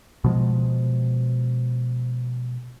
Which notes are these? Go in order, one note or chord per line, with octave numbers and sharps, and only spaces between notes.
B2 F3 G#3